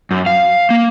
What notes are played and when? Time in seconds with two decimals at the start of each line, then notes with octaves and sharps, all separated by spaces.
0.11 F#2
0.26 F5
0.70 A#3